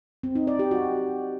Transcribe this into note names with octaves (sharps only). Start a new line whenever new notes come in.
C4
D#4
D5
G4
F#4